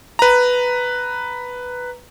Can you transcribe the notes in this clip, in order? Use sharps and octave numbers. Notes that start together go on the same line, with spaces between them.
B4 A#5